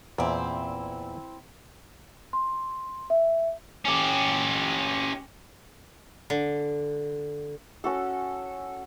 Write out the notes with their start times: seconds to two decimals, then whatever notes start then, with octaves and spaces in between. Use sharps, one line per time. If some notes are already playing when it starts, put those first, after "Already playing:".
0.18 E2 A#2 C4 E4
2.33 C6
3.10 E5
3.85 C#4 G4
6.30 D3
7.84 C#4 F#4 A4